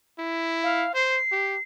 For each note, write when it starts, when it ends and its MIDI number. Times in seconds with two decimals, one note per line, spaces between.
0.19 0.87 64
0.63 0.92 77
0.94 1.19 72
0.94 1.61 96
1.32 1.56 67